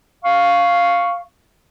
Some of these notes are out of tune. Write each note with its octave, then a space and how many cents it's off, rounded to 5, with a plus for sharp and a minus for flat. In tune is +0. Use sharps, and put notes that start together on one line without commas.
F5 +0 C#6 +0